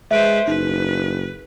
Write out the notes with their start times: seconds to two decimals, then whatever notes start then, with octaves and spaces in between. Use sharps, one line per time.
0.11 G#3 B4 C5 E5 D7
0.48 F#1 D#4 B4